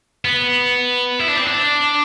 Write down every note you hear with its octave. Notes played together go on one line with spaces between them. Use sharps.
B3
E4
D4
C4
D4